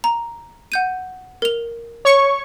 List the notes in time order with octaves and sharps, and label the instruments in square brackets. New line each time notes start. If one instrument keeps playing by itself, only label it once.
[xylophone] A#5
F#5 G6 D#7
A#4 F7
[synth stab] C#5 C#6